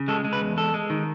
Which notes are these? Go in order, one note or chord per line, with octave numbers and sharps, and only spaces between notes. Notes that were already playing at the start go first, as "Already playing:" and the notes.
Already playing: C#3
G#3 A4
G#3
B4
E2
G#3 A4
G#3
D#3